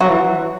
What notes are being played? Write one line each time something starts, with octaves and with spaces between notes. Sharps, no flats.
F#3 F#4
E3